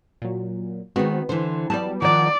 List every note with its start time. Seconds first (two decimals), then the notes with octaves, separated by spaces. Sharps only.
0.22 A#2 F#3
0.96 D#3 G#3 B3 C4 F#4
1.29 D3 E3 C5
1.70 F#3 G3 B3 D5 A5
2.02 D#3 F3 D5 F#5 D6